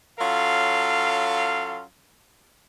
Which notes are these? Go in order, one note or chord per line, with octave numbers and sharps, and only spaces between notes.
F#3 C#4 F4 A4 F5